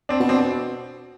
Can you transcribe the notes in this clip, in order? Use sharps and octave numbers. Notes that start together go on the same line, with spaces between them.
C4 D4
B2
C4 D4